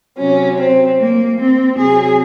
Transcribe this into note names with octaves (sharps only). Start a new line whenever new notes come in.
C3 F#3 C#4
C4
A#3
C4
C3 F#3 G#4